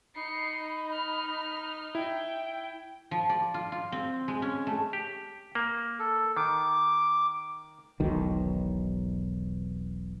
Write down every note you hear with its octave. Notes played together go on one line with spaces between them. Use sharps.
D#4 B5 C7 C#7
F6
E4 G5
F3
D5
F4
F4
C4
G#3
C#4
A3
G4
A#3
A4
D#3 D6
E1 B1 D#3